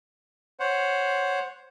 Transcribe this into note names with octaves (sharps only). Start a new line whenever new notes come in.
C5 C#5 F#5